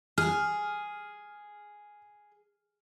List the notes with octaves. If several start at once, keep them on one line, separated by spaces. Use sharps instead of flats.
G#4 F6